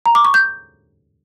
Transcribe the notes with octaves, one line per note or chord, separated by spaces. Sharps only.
A#5
D6
C#6
G6